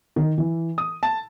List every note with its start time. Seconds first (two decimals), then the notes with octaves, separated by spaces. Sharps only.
0.16 D#3
0.38 E3
0.78 D#6
1.03 A5